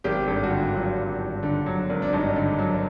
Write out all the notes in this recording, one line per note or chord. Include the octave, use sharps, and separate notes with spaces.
G#1 G4
G2 A4
F#4
D3 F4
F#3 F4
G#1
G2
D3
F#3
G#1
D4
G2 D#4
D3
F#3